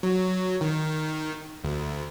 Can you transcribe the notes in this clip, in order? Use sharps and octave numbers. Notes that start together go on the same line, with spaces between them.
F#3
D#3
D2